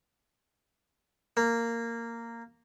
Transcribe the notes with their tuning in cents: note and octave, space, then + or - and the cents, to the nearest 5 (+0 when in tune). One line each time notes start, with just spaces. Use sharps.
A#3 -10